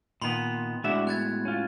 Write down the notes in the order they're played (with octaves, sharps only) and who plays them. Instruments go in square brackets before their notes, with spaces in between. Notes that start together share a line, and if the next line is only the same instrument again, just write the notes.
[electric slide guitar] A#2 D#3 B3 [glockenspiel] B5 C6
[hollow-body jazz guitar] A2 G#3 F#4 [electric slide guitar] D4 E5
[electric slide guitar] B3 [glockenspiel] F#6 G#6 A6
[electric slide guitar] C#4 F4